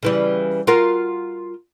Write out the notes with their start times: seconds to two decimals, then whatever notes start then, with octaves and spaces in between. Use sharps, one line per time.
0.03 C#3 E3 G3
0.67 F4 F#4 A#4